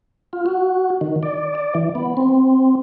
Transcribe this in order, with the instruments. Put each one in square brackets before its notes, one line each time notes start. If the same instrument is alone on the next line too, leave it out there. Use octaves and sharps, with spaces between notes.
[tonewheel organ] F4
F#4
D#3
D5
D5
E3
B3
C4